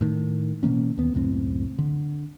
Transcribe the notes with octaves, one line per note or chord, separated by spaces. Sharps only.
A2 D#3
B2 E3 A#3 C#4
D#2 B3
C#2 F#2 A2 C4
D3